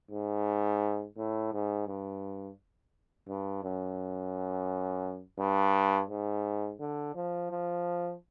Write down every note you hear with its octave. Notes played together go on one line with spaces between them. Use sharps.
G#2
A2
G#2
G2
G2
F#2
G2
G#2
D3
F3
F3